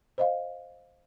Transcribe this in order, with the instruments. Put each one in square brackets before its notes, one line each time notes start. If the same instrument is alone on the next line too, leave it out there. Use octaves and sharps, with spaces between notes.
[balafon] C5 D#5 F5